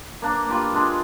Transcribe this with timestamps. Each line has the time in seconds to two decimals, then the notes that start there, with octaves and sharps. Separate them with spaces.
0.22 A#3 D4
0.49 F4 G4 B5 D6
0.74 G#3 D4